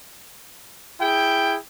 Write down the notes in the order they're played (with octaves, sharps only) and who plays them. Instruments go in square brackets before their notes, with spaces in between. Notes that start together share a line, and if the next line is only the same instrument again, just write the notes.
[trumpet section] E4 G#4 G5